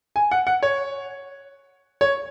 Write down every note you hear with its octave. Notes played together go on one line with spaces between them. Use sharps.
G#5
F#5
F#5
C#5
C#5